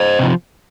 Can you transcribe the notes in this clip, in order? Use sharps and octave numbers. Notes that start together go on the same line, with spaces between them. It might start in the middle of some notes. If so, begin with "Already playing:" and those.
Already playing: C5 D#5
C3 F3